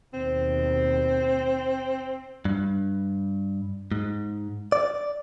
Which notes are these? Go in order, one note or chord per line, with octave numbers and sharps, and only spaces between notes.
D#2 B2 C4
G2
G#2
D5